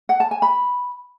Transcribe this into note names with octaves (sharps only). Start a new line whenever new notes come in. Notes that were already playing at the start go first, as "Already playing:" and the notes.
F#5
A5
G#5
B5